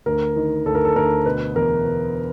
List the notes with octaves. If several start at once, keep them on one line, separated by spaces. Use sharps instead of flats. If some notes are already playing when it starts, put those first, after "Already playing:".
D2 A#4
D#3
D2 A4
A#4
A4
D2 A#4
B2 B4
E2 A#4
B2